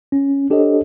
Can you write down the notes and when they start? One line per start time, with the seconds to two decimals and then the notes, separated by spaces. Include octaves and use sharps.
0.12 C#4
0.50 D4 G4 A4 C5 C#5 D#5